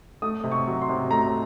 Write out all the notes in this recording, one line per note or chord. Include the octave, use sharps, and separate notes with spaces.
A3 D#6
C3
C#6
F#3
C6
C3
A3 A#5